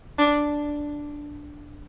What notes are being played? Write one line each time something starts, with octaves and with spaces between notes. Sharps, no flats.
D4